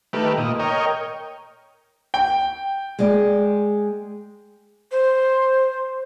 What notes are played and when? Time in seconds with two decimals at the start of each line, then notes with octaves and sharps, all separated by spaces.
0.13 D#3 A3 G4 B4
0.37 A#2 D#5
0.59 A#4 C#5 D#5 G5
2.14 G5
2.99 G#3 D5
4.92 C5